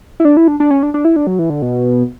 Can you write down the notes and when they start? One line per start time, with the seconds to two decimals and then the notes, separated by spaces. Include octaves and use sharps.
0.20 E4
0.25 D4
0.37 E4
0.48 D4
0.60 D4
0.70 C#4
0.83 D4
0.94 D4
1.05 E4
1.16 D4
1.27 F#3
1.39 E3
1.50 D3
1.62 B2